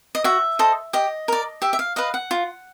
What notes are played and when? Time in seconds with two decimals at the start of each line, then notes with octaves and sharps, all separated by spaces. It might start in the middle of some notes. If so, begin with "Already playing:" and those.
0.15 D#5
0.24 F#4 E5
0.59 A4 C5 D#5
0.93 G4 D#5
1.28 A#4 D5
1.62 G4 E5
1.73 E5
1.79 F5
1.96 B4 D#5 F5
2.14 F#5
2.31 F4